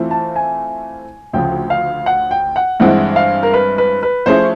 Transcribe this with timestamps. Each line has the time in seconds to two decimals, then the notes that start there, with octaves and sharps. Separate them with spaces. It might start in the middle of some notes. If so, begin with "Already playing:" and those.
Already playing: E3 A3 C4 F4
0.11 A5
0.36 G#5
1.33 D2 C#3 F3 G5
1.70 F5
2.06 F#5
2.31 G5
2.56 F#5
2.80 G2 E3 G#3 C4 E4 F#5
3.16 F5
3.43 A#4
3.54 B4
3.78 B4
4.03 B4
4.26 F3 A3 C#4 E4 G#4 C5